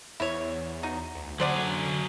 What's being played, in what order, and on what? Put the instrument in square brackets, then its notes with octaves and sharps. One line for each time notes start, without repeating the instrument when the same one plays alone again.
[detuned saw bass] E2 [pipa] E4 C#5
[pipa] D#4 F#4
[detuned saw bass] D2
[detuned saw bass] D3 [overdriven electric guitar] F#3 G#4 [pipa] C5 D5 F#5